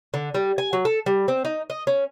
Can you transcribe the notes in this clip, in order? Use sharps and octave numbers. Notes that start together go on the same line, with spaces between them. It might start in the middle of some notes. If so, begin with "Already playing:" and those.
D3
G3
G#5
F#3
A4
G3
C4
D#4
D#5
C#4